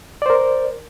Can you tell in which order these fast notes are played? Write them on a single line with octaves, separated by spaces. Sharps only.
D5 C5 A#4